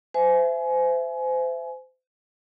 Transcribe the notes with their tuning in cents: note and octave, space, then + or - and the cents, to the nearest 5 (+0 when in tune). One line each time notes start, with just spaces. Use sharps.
C5 -30 E5 +20 G#5 +25